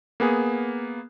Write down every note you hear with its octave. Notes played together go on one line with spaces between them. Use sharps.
A#3 B3 G#4